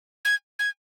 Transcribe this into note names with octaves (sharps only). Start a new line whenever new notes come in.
G#6
G#6